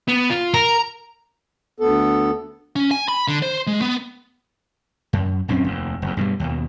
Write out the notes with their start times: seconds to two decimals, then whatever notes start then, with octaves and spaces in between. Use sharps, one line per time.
0.08 B3
0.30 F4
0.54 A#4 A#5
1.80 D2 B3 A4
2.76 C#4
2.91 G#5
3.08 B5
3.28 D3
3.42 C5
3.67 G#3
3.81 B3
5.13 F#2
5.48 A#1 F#2 C4 C#4
5.64 F1 D#2
6.02 F#1 E2
6.17 G2 B2 F#3 G3
6.40 D#2 B2